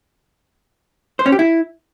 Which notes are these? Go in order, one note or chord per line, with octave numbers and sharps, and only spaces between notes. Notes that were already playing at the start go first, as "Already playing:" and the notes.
C5
C#4
G4
E4